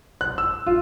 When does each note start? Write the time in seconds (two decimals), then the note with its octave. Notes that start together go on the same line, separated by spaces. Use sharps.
0.21 F#6
0.38 E6
0.67 F4